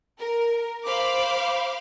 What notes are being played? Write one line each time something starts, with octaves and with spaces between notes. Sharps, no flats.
A#4
C5 F5 B5 D6